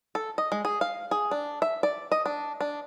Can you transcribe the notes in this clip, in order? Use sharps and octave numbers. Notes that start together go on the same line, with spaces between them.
A4
D#5
G#3
G#4
F5
G#4
D4
E5
D5
D#5
D4
D4